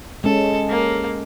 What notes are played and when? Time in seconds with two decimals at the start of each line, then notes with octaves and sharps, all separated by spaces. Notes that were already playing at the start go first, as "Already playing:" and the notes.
0.24 G#3 C#4 A4
0.70 A#3